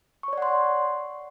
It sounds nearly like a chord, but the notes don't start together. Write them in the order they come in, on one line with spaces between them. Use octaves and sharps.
C#6 C#5 D5 F#5 C6